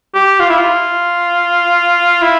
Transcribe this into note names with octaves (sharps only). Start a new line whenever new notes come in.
G4
F4
E4
F4
E4